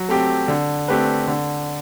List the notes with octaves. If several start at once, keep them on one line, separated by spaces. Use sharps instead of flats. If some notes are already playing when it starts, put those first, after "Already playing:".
Already playing: F#3
A3 C4 G4
D3
A3 C4 G4 B4
D3